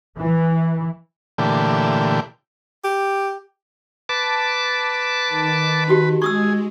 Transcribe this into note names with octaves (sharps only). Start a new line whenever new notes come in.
E3
A#2 D3 E3 A3 G4
G4
B4 A5 D6
D#3
D#4 F#4 G4
G#3 G#4 C#6 D#6 E6